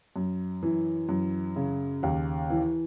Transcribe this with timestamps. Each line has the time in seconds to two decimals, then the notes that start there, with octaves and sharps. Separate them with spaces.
0.16 F#2
0.63 E3
1.09 F#2
1.56 C#3
2.03 D#2
2.50 E3